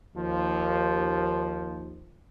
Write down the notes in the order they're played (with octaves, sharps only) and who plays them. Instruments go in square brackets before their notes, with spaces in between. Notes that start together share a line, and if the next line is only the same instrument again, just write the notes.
[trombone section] D#2 F3